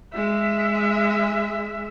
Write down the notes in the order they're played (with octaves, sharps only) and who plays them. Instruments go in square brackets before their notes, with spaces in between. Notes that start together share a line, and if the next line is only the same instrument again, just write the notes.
[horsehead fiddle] G#3 E5